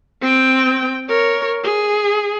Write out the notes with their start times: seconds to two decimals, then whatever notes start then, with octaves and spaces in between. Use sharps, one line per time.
0.22 C4 G5
1.09 A#4 C#5
1.63 G#4